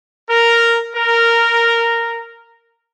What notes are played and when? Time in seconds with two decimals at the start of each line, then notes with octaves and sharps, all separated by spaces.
0.29 A#4
0.95 A#4